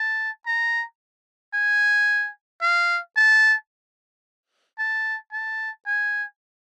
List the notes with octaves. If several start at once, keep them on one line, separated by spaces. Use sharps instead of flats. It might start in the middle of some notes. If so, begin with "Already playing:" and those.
Already playing: A5
A#5
G#5
F5
A5
A5
A5
G#5